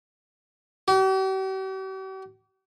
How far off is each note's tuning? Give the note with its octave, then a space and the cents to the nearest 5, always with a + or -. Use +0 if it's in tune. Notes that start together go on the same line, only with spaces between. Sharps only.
G4 -45